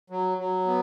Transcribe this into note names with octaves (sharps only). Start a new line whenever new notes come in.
F#3
F#3
B3